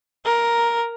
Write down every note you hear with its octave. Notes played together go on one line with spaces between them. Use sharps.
A#4